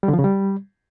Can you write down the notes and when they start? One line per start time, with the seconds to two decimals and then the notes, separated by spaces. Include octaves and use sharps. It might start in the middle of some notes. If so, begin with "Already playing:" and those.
0.03 G3
0.08 D3
0.13 F3
0.19 C#3
0.24 G3